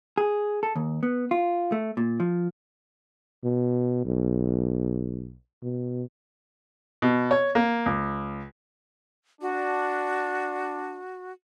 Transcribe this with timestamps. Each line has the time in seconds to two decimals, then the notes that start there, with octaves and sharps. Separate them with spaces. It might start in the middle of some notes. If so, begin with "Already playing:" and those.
0.18 G#4
0.63 A4
0.76 D#2
1.03 B3
1.31 F4
1.72 A3
1.97 A#2
2.20 F3
3.44 B2
4.05 B1
5.62 B2
7.02 B2
7.31 C#5
7.55 A#3
7.86 C#2
9.42 D4 F#4